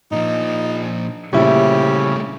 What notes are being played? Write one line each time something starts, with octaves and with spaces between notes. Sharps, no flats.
A#2 F3 D#4
A#1 C#3 G3 A3 E4 G4